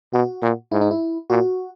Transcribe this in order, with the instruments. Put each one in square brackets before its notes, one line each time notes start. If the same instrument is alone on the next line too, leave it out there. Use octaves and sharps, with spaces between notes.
[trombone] B2 [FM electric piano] F#4
[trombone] A#2
[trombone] G#2 [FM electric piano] E4
[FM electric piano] D#4
E4
[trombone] A#2 [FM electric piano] F#4